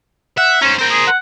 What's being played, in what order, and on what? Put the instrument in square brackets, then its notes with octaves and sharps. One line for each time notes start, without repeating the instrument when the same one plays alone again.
[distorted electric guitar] E5 [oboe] F#5
[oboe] C#4 [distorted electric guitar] D#4 C5
[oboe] C4 [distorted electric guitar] A#4 C5
[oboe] G#4
F#5